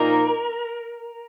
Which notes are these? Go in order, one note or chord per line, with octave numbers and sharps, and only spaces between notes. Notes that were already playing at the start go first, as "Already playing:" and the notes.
Already playing: A#2 F3 A#3 D#4 A#4